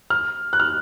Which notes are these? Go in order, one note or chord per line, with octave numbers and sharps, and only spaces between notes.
F6
F#6
F6